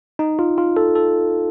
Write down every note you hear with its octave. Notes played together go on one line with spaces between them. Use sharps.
D#4
F4
F4
A4
A4